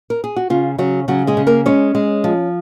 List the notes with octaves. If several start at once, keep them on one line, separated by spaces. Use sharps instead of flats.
A#4
G#4
F#4
C#3 F4
C#3 F#3 F#4
C#3 F#3 F#4
G#3 G#4
C#3
A#3 A#4
G#3 C#4 C#5
G#3
F3